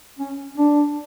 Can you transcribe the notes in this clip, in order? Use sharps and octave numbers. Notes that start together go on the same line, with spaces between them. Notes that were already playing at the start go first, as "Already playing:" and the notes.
C#4
D4